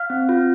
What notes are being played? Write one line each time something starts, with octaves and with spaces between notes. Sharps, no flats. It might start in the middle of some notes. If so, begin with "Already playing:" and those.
Already playing: F5 F6
C4
F4